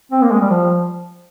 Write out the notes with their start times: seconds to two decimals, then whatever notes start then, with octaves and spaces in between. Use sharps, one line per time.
0.12 C4
0.22 A#3
0.31 G#3
0.41 G3
0.50 F3